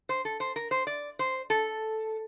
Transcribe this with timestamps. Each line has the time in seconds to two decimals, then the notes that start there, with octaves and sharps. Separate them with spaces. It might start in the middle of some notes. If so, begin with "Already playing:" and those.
0.09 C5
0.25 A4
0.40 C5
0.56 A#4
0.71 C5
0.87 D5
1.19 C5
1.50 A4